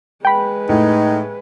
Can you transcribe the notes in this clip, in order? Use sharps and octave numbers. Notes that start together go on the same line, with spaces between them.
G#3 B4 G5 B5
A2 D#4